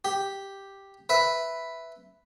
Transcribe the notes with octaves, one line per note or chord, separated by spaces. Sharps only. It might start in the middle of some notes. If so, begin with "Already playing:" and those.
G4
B4 E5